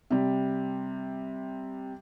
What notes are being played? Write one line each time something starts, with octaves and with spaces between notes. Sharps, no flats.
C3 G3